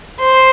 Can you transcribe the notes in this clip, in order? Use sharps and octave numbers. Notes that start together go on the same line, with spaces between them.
C5